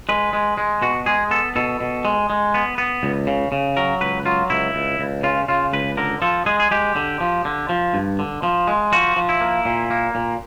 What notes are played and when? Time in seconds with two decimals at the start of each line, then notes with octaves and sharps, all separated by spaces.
0.09 G#3 B4
0.33 G#3
0.58 G#3
0.82 B2 F#4
1.06 G#3 G#4
1.31 B3 A4
1.56 B2 A4
1.81 B2
2.05 G#3
2.30 G#3
2.54 B3
2.78 B3
3.03 C#2
3.27 C#3
3.52 C#3
3.77 F#3 A#4
4.01 C#2 B4
4.25 F#3 F4
4.50 C#2 E4
4.75 C#2
4.99 C#2
5.23 C#3 F4
5.48 C#3 F4
5.73 C#2 B4
5.97 D3 A#4
6.22 F3 A4
6.46 G#3 G#4
6.60 G#4
6.71 G#3 G4
6.96 D3
7.21 F3
7.45 D3
7.69 F3
7.94 G2
8.19 D3
8.43 F3
8.67 G#3
8.92 F3 F#4
9.16 F3
9.29 E4
9.41 A#3
9.65 A#2
9.90 A#3
10.15 A#2